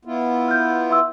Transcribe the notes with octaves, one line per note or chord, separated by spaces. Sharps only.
B3 E4 F4
F6 G6
E5 C6 E6